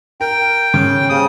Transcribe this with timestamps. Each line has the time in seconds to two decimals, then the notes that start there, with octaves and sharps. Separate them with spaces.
0.21 A#4 G5
0.74 C#3
1.10 D#1 C#3 D#6